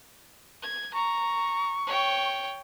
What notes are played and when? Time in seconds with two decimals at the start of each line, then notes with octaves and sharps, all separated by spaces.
0.63 G#6
0.94 A#5 C#6
1.87 C#5 G5